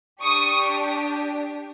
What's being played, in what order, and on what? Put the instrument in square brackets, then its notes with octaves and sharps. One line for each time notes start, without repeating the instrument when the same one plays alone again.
[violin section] D4 G4 C#6 D#6